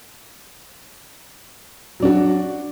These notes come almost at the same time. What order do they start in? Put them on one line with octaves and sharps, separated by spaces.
F#3 D4 F#4